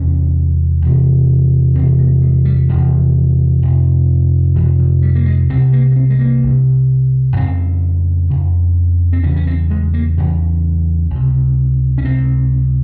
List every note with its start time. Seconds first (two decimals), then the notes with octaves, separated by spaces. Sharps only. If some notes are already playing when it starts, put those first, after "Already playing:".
Already playing: E2 C3 C#4
0.82 E2 C3
1.75 E2 C4
1.79 C3
1.99 A#3
2.22 G#3
2.45 G3
2.69 E2 C3 F3
3.63 F2 C3
4.56 F2 C3 E3
4.79 F3
5.02 G3
5.15 A#3
5.26 G#3
5.50 C2 C3 C4
5.73 A#3
5.91 A#3
5.96 C4
6.10 G#3
6.19 A#3
6.43 C2 C3
7.36 F2 C#3 C4
8.30 F2 C#3
9.13 C4
9.23 E2 C#3 C#4
9.36 C#4
9.47 C4
9.70 G#3
9.94 A#3
10.18 E2 C#3 C#4
11.10 C#2 C3
11.98 C#4
12.05 C#2 C3 C4